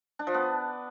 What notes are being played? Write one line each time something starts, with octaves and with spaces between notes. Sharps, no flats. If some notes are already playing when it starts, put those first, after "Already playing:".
D4
F3
B3